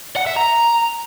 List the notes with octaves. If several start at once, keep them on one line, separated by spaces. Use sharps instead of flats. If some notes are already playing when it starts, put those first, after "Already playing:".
F#5
E5
A#5